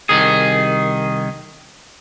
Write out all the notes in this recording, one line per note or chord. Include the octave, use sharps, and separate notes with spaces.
C2 D#3 G#4